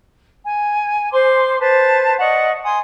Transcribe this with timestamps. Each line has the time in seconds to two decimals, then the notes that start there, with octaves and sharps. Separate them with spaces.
0.46 G#5
1.11 C5 C6 D6
1.60 B4 C5 A5
2.20 D5 D#5 F#5 C#6
2.64 G#5 C6 D#6